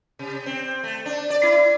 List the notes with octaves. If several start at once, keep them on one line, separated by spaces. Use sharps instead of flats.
C3
C4
A3
D4
D5
E4